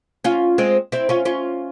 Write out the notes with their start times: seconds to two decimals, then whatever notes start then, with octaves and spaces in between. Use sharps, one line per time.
0.24 C#4 F4
0.58 G#3 C4
0.92 C4 E4
1.09 C#4 F4
1.25 C#4 F4